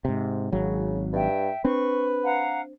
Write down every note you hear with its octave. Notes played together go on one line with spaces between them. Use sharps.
G#2 C3
G#1 C#3 F#3
G2 E5 G5
C4 D4 B4 C#6
F5 F#5 A#5